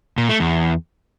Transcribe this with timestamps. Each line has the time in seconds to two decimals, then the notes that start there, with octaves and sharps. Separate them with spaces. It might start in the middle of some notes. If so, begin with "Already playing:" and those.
0.18 A#2
0.29 A3
0.40 E2